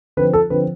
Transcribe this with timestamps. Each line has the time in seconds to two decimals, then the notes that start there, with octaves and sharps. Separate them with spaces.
0.17 D3 F3 C4 B4
0.33 A4
0.50 D3 F3 C4 B4